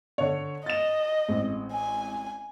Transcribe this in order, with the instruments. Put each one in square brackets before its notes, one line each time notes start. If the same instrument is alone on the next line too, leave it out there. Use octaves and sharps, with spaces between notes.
[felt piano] D3 C#5
[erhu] D#5 [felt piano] A6 E7
[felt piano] A1 G#3 C4
[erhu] G#5